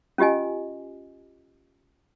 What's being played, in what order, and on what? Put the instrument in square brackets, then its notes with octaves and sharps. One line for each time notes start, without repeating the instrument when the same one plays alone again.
[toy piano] C#4 F4 G4 D#5 G#5